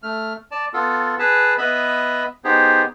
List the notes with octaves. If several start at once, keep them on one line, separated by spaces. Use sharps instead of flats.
A3 F6
D5 A5
B3 F4 A4
G#4 B4 A5
B3 B4 D#5 E5 B5
B3 D#4 G4 G#4 C5